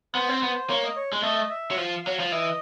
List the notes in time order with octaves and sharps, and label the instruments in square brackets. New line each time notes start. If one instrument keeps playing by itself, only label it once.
[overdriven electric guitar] B3 [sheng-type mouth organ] C5
[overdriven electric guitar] C4
B3
[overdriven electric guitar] A#3 [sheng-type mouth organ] C#5
[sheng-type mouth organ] D#5
C#5
[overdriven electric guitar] G#3
[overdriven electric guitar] A3 [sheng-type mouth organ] D#5
[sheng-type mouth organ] E5
[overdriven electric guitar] F#3
[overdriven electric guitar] F3 [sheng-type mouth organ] F5
[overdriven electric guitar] F#3 [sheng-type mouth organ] F5
[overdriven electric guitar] F3
[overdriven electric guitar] E3 [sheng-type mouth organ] D#5